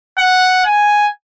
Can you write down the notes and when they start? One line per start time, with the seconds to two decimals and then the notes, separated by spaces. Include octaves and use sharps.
0.18 F#5
0.65 G#5